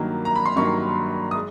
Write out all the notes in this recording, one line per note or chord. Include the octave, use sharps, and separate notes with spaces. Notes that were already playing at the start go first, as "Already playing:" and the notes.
Already playing: G2 D#3 F#3 A#3
A#5
B5
C6
G2 D#3 F#3 A#3 C#6
D#6
G#3